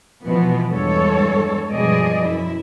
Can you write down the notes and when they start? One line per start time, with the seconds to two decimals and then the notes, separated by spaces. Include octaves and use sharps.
0.25 B2 E3 F3 B3
0.72 E2 G2 G#3 A4 C#5
1.71 G2 B2 F3 G#4 D5 D#5
2.22 F#2 E4